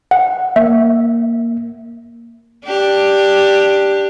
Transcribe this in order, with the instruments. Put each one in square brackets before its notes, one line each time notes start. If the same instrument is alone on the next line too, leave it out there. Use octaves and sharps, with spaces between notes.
[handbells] F#5
[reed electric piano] A#3 [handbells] E5
[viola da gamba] D4 G4